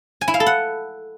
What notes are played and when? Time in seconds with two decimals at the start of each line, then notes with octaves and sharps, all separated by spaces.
0.21 G#5
0.28 E4
0.34 F5
0.40 A4
0.46 F#5